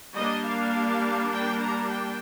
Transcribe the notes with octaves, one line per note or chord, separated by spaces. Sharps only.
G3 A#3 D4 D#5
F5
G5
A#5
G5